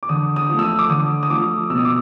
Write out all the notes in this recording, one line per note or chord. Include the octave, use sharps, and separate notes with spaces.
D6
D3 D#6
D#6
F3 A3
E6
D#6
D6
D3 D#6
D#6
F3 A3 D6
B2 E6
D#6
D6